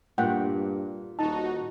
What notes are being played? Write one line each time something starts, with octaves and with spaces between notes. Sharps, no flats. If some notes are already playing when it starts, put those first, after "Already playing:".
G2 A#2 F#5 G5
D#1 D#4 F#4 A5